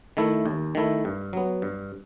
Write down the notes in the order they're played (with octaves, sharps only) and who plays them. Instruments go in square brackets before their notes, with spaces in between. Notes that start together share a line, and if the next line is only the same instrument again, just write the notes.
[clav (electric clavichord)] D#3 A3 E4
D#2
D#3 A3 E4
G2
F#3 B3
G2